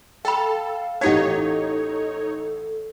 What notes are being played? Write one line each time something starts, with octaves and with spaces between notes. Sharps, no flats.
A4 F5 G5 B5
A1 D#4 G4 A4 C#5 F5 F#5 G#6